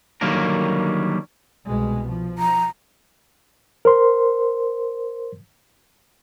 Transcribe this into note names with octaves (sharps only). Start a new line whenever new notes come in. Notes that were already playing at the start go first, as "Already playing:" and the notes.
D3 D#3 F#3 G3 A#3 A#4
C2 B2 G#3
F3
A#5
A#4 C5 C6